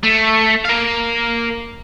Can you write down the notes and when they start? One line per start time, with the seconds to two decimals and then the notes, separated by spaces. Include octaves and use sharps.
0.04 A3
0.65 A#3 F5